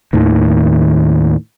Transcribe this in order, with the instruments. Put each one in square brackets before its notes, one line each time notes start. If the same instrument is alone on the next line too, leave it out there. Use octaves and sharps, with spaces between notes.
[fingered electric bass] D#2 A2 D#3